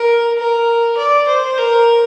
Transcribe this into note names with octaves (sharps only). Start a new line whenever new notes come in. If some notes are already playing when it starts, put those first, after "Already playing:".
Already playing: A#4
A#4
D5
C5
A#4